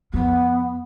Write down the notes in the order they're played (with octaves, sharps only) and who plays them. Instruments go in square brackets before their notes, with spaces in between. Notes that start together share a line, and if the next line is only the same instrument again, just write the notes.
[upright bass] F2 [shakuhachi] B3